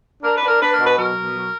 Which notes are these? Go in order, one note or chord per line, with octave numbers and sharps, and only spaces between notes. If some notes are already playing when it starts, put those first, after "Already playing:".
D4 A#4
B4
D4
A#4
D4 B4
A#4
B2
B4
F#3 A#4
B2
F#3